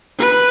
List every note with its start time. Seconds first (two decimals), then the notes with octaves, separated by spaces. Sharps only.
0.20 B4